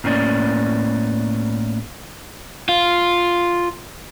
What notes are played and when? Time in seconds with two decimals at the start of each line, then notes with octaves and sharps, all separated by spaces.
0.04 A2 A#3 B3 C#4 D5
2.69 F4